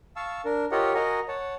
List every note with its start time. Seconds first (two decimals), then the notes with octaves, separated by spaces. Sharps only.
0.16 F5 A5 C#6 E6
0.45 D4 A#4
0.72 F4 G4 A#4 C#5 D#5 F#5
0.95 F#4 A#4 D#5 F#5 G#5 A#5
1.28 C#5 F#5 A5